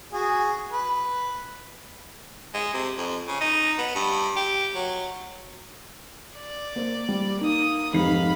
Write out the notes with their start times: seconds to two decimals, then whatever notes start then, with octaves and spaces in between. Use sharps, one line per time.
0.13 F#4 G#4
0.72 B4
2.54 G#3
2.74 C3
2.97 F2
3.28 C#3
3.41 D#4
3.78 B3
3.95 G2
4.36 G4
4.75 F#3
6.36 D5
6.76 A#3 C5
7.08 G3
7.41 A#3 D#4 D#6
7.93 F1 G#2 F5 B5 C7